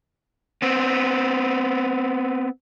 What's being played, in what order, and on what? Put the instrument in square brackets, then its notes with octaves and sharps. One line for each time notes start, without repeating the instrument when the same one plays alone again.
[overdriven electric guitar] B3 C4